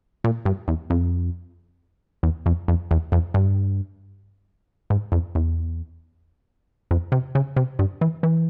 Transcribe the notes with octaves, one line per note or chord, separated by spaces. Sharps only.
A#2
G2
E2
F2
E2
F2
F2
E2
F2
G2
G#2
F2
E2
F2
C3
C#3
C3
G2
E3
E3